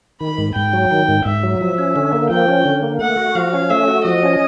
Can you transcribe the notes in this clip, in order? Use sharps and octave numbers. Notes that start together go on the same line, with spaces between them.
D#3 B5
G#2
G#2 G5
F#3
D#3
G#2
G#2 E5
F#3
F3 E5
C#4
D3
A#3
F3 G5
C#4
D3
A#3
A3 F#5
F#4
F3 F5
C#4
A3 E5
F#4
F3 D#5
C#4